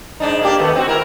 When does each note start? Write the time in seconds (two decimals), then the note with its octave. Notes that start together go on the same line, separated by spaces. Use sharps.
0.20 G#2 D4 D#4
0.41 A#3 D4 G4
0.59 D#2 A3 B3
0.75 C4 F#4
0.88 E4 A#4 E5